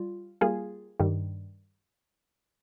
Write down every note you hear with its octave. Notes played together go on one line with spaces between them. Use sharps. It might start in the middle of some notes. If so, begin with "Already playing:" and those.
Already playing: G3 F4
G3 A#3 F4 G#4
G2 D#3 G3